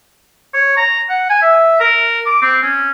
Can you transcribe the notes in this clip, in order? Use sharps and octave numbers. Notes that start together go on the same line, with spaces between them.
C#5
A#5
F#5
G#5
E5
A#4
D6
C4
C#4